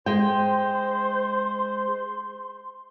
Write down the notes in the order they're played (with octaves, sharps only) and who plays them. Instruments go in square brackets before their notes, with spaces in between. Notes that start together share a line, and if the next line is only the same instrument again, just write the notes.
[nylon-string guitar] G#3 G5 [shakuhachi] C5 [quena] C6